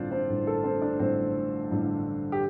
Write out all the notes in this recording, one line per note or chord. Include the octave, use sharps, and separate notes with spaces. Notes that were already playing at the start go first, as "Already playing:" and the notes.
Already playing: A1 G2 D3 C4 D4 F4 C5 D5
C4 C5
A1 G2 D3
A4
C4 C5
D4 D5
A1 G2 D3 C4 C5
A1 G2 D3
G4